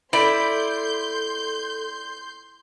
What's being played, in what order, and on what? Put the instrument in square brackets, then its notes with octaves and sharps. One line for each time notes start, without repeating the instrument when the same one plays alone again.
[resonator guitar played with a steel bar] E4 [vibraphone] A4 [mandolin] D5 [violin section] C6 G6